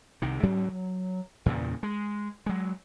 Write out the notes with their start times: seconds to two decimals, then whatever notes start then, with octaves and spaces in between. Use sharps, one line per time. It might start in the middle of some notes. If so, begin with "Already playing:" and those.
0.22 C2 C3 D#3
0.43 G#2 F#3 G3 C#4
0.69 F#3
1.46 E2 G2 A#2 C#3
1.83 G#3
2.46 F#3 G#3